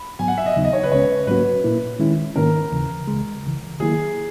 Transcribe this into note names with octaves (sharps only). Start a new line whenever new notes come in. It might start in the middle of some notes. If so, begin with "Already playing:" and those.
Already playing: B5
G#2 F#3 B3 G#5
F#5
E5
D#5
D#2 C#3 F#3 B3 D#4
D#5
C#5
B4
C#2 C#3 G#3 C#4 C#5
G#2 F#3 A#3 C#4 F#4 B4
A#2 A#3 E4
D#3 G#3 C#4 E4
G#2 D#3 A#3 C#4 A#4
D#2 C#3 E3
C#2 C#3 G#3
C#2 C#3 E3
D#3 F#3 A#3 E4 G#4